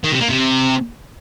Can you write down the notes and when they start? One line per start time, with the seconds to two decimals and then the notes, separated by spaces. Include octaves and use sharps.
0.04 D#3
0.12 C3
0.21 A#3
0.29 C3